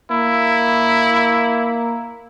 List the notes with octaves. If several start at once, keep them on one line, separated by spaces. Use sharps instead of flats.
A#3 E4